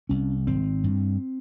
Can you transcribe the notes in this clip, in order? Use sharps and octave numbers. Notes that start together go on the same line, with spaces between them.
C2 C#4
G#1 C4
G2